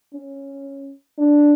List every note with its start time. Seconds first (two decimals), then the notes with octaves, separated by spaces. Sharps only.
0.13 C#4
1.18 D4